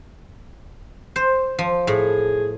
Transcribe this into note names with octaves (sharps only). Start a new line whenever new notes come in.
C5
F3
A2 G#4